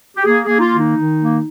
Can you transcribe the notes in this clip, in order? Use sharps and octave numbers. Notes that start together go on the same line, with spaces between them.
G4
A#3 G#4
A#3 G#4
D#4
F4
D#3
D#4
D#3
A#3